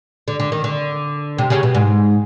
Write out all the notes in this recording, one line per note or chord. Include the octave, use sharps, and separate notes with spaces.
D3
D3
D#3
D3
C3
C#3
B2
G#2